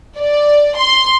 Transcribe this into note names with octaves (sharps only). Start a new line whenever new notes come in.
D5
C6